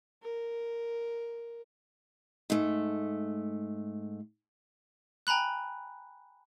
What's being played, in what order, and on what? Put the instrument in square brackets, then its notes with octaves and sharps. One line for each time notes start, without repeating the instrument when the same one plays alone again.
[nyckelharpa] A#4
[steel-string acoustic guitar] G#2 A3
[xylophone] G5 G#5 A#5 B5 F#6